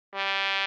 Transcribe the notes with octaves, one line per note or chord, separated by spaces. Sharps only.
G3